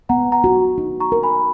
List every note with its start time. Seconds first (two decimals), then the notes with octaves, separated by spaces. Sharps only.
0.09 B3 F#5 A#5
0.32 F#5 A#5
0.44 F#4
0.78 D#4
1.00 A#5 C#6
1.12 A#4
1.23 G#5 B5